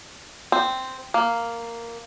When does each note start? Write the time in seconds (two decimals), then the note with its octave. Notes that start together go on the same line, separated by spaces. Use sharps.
0.52 C4
1.14 A#3